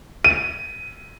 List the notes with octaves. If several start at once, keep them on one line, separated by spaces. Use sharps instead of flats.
D#7